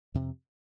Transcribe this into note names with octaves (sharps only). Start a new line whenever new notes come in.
F2 C3